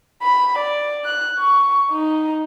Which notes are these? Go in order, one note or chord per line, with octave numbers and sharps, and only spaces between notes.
B5
D5
F#6
C#6
D#4